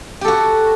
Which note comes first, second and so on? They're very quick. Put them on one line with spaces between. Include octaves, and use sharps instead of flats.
G4 A4 F#4